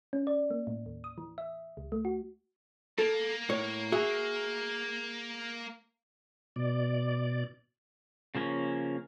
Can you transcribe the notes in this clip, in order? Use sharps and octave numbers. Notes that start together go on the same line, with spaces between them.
C#4
D5
A#3
A2
D#2
D#6
E3
E5
C#2
A3
F#4
A#3 A4
A2 C#5
F#4 G#4 E5
B2 D5
C#3 F3 A#3 C#4